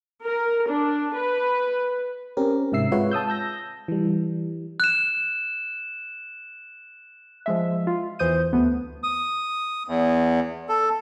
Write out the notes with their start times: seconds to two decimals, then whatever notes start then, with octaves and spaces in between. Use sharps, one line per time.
0.24 A#4
0.69 D4
1.15 B4
2.37 C4 C#4 G4 A#4
2.72 G#2 C3 E5 E6 C7
2.92 G#3 F4 B4 C#5 E5 F#5
3.11 A5 D#6 E6 G6
3.27 A5 E6 G6 A#6
3.88 E3 G3
4.80 F#6 E7
7.46 F3 G#3 E5
7.87 F4
8.19 E2 E3 C5 D#6 G6 D#7
8.53 D2 A3 B3
9.03 D#6
9.88 E2
10.69 A4